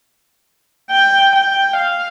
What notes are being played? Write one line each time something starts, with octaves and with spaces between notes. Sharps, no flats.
G5
G5
F5